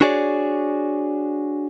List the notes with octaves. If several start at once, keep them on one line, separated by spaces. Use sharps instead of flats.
D4 F#4 G#4 C#5 D5